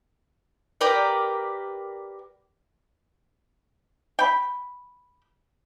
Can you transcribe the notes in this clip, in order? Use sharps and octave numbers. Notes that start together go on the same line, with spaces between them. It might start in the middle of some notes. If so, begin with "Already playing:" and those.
G4 A#4 B4 D5
G5 B5